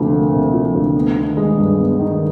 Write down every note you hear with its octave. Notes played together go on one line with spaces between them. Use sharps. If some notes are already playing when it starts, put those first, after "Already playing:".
Already playing: D2 C3 F3 A#3
A#3
C3
F3
D2
B3
D#3
G#3
G2
B3
D#3